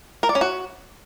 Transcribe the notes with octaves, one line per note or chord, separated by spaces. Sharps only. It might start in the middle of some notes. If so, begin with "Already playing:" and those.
A#4
D5
C#4
F#4